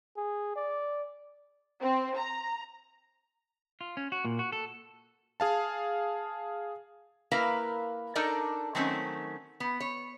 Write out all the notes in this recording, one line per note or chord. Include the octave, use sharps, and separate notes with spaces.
G#4
D5
C4
A#5
F4
C#4
F#4
A#2
F#4
A4
G#4 F5 A5
A#3 E4 A#4 B4 F5
D4 D#4 A4 A#4 D5
D#3 F#3 A3 C4 C#4
B3
C#5